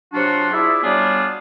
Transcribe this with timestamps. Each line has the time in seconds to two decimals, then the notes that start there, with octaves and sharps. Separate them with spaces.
0.13 C3 F#3 D4 F4 F#4
0.53 E4 F4 G#4 D5 E5
0.83 F#3 G3 B3 D4 F4 G#4